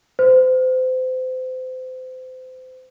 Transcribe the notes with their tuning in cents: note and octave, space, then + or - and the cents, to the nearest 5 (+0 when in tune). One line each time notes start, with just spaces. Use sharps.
C5 -30